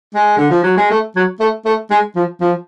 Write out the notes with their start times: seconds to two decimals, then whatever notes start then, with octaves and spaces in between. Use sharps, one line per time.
0.14 G#3
0.37 D3
0.50 F3
0.63 F#3
0.77 G#3
0.91 A3
1.16 F#3
1.40 A3
1.65 A3
1.91 G#3
2.16 F3
2.41 F3